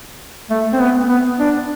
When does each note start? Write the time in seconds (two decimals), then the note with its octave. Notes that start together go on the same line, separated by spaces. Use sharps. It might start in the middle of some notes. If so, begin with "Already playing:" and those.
0.50 A3
0.73 C4
0.80 B3
1.09 B3
1.39 D4